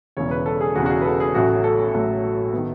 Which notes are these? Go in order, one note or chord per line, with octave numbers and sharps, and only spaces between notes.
E1 E2 C#3 C#5
B4
A4
G#4
E1 E2 C#3 F#4
F#4
G#4
B4
A4
G#4
A1 A2 F#3 A3 F#4
A4
A1 A2 F#3 A3 A4
D#3 B3